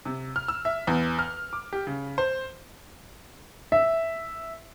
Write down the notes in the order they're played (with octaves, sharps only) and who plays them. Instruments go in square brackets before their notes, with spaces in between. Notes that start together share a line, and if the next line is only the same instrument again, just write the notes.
[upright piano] C3
F6
E6
E5
E2
F6
D6
G4
C#3
C5
E5